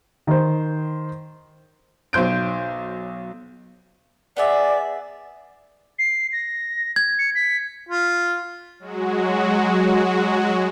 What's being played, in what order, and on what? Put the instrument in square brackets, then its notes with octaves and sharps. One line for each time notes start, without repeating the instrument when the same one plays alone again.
[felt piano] D#3 C5
[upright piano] B1 F#3 C5 G6 D7
[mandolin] B3 G#4 E5 [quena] D5
[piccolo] C7
A#6
[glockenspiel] G#6
[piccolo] C#7
B6
[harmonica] F4
[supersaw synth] F#3 G#3 F#4